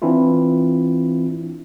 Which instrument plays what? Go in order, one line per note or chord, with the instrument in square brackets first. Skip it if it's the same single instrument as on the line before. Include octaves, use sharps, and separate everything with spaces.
[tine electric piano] E3 C4 D4 E4 F4